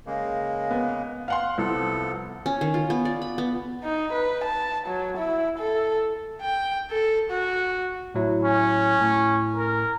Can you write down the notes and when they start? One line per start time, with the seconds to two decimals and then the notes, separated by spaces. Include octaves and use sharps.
0.06 C#3 G#3 A#3
0.71 B3
1.28 F5 F#5 C6
1.58 C2 F3 B3 A4
2.46 C#4
2.61 D#3
2.74 F4
2.90 B3
3.05 D5
3.22 B5
3.38 B3
3.84 D#4
4.13 B4
4.44 A5
4.87 F#3
5.17 E4
5.58 A4
6.41 G5
6.91 A4
7.30 F#4
8.14 A2 F#3 E4
8.45 C#4
9.00 A2
9.57 A#4